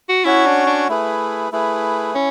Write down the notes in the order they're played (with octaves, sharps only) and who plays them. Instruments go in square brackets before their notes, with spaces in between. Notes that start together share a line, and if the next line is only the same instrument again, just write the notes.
[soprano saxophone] F#4
[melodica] C#4 F#4 C#5 F#5 [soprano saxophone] E4
[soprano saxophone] D4
D4
[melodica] A3 E4 G#4 B4
A3 E4 G#4 B4
[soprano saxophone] C#4 [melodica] E4